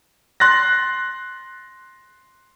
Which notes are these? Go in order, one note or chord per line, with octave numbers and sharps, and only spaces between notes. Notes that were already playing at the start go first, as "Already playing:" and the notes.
C6 F#6 A6 A#6